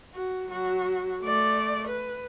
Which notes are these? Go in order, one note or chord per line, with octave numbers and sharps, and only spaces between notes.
F#4
F#3 F#4
A3 D5
B4